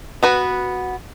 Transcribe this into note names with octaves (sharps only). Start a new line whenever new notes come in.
B3 F#4 B4